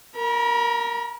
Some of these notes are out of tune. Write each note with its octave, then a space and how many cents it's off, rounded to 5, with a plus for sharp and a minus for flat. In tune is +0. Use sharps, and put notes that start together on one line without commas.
A#4 +0 B5 -45